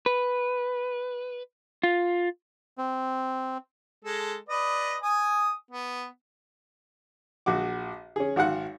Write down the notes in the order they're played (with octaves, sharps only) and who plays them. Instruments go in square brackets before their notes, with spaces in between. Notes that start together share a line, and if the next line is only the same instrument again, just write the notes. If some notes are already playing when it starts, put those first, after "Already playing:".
[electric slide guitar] B4
F4
[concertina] C4
[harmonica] G#3 A4
B4 D5 D#5
G#5 D#6
B3
[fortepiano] A#1 F#4 D6
C#4 G#4
G#1 F#4 F5 F#5